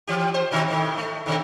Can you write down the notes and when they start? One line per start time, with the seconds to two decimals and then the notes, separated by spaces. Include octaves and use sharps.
0.07 E3 G4
0.34 C5
0.51 B2 D#3 F#3
0.68 A2 D#3
0.97 A3
1.26 B2 D3 D#3